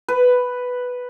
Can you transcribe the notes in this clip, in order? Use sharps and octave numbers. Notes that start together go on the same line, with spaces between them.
B4